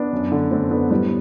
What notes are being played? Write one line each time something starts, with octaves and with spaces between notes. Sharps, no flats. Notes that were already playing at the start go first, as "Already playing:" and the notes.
Already playing: B3 D4
F#2
D3
F#2 A3 C4
D3 B3 D4
A2 G3 B3